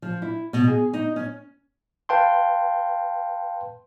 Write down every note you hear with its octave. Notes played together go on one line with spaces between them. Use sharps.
F3
E4
B2
G#4
D#4
C#4
B4 F5 G5 A5 C6